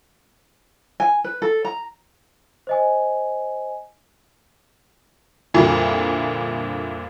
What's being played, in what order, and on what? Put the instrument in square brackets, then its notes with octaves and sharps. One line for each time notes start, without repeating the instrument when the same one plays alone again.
[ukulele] G#5
B4
A4
A#5
[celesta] C5 D#5 G#5
[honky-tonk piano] C2 F2 A#2 D3